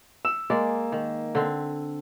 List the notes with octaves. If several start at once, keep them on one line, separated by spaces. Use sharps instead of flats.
E6 E7
G#3 A#3 D5
D#3
D3 C4